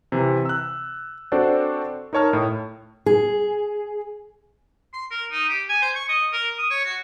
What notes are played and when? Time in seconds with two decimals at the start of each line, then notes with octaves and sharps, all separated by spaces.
0.12 C3 E3
0.45 E6 F#6
1.32 C4 D4 F#4 A4 C5 D5
2.13 D#4 A#4 C#5 A5 F6
2.33 A2
3.06 G#4
4.94 C6
5.11 A#4
5.32 D#4
5.49 G4
5.69 G#5
5.82 C5
5.95 C#6
6.09 D#5
6.33 A#4
6.59 D#6
6.71 C#5
6.85 F#4